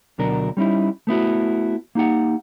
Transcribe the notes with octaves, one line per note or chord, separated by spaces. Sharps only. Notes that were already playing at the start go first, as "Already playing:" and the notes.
D2 B2 F#3 D4 A#4
G3 C#4 D#4 E4
A3 B3 E4 F#4
A#3 D#4 G4 F#5